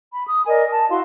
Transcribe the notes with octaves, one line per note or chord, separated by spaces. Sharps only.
B5
D#6
A#4 D5 D#5 G#5
A5
E4 F#4 F5 C6